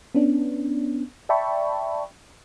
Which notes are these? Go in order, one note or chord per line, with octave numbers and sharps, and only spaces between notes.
B3 C#4 D4
D5 E5 G5 A5 B5 C#6